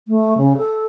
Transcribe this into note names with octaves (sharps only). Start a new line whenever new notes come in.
A3
C#3
A4